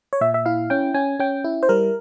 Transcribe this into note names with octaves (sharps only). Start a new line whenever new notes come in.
C#5
A#2 E5
E5
E4 F5
C#4 G5
C#4 G#5
C#4 G5
E4
C5
G3 A#4